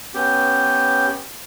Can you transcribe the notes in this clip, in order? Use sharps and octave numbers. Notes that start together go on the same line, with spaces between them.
B3 C#4 G4